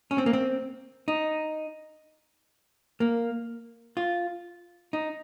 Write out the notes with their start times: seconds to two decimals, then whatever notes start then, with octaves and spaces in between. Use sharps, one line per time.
0.11 C#4
0.18 C4
0.26 A#3
0.33 C4
1.08 D#4
3.00 A#3
3.97 F4
4.93 D#4